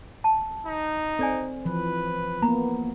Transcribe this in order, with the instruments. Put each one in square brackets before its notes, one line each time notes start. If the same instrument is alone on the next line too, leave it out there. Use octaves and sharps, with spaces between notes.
[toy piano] A5
[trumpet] D#4
[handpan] C4 [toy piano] A4 D5 G#5
[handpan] E3 F3 [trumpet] B4
[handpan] A#3 B3 [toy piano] A#5 B5